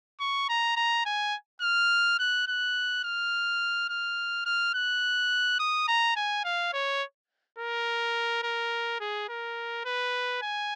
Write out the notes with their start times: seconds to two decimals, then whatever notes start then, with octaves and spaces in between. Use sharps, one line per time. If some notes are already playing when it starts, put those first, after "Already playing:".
0.20 C#6
0.49 A#5
0.77 A#5
1.05 G#5
1.62 F6
2.19 F#6
2.48 F#6
3.04 F6
3.89 F6
4.46 F6
4.74 F#6
5.59 D#6
5.88 A#5
6.16 G#5
6.44 F5
6.73 C#5
7.59 A#4
8.43 A#4
9.00 G#4
9.29 A#4
9.85 B4
10.42 G#5